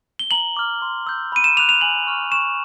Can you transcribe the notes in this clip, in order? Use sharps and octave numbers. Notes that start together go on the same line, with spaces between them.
G7
A#5 F#7
D6 F6
C6
E6 G6
B5 D#7
E7
D6 F#6 F7
F7
G#5 F#7
C#6 F6
C#6 E7